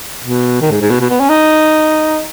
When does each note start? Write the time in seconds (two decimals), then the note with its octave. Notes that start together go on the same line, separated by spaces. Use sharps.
0.23 B2
0.61 D#3
0.71 G#2
0.81 G#2
0.90 B2
1.01 B2
1.10 B3
1.20 C#4
1.29 D#4